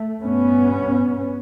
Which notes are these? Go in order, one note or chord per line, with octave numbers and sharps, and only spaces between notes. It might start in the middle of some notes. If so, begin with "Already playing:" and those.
Already playing: A3
G2 B3 C#4